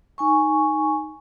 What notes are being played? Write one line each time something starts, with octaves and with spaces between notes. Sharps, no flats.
D#4 G#5 C#6